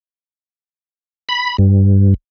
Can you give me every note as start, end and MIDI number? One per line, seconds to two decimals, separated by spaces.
1.29 1.57 83
1.58 2.14 43